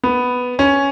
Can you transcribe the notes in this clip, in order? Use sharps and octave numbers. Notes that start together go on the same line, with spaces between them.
B3
C#4